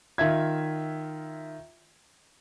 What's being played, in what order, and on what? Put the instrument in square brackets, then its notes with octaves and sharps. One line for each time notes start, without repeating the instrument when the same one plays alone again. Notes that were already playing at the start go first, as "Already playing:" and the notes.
[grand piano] D#3 F4 E5 G#6